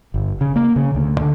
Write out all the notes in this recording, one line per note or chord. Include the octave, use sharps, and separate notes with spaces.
G1
C#3
A#3
C#3
D2
D3